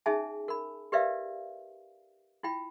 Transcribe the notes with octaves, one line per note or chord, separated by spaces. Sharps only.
C#4 D#4 G#4 E5 G#5 A5
A#4 B5
G4 A#4 B4 D5 E5 F5
E4 F4 G5 B5